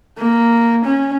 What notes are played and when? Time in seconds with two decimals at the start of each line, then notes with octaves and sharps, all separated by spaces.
0.18 A#3
0.85 C#4